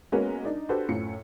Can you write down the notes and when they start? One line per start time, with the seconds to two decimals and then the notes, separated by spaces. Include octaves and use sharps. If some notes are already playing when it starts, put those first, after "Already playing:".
0.12 G#3 A#3 B3 C#4 F#4 A#4
0.45 D4 D#4 D5
0.69 D4 F#4 G4 A4 B4 C5
0.89 F#2 A2 F4 C#7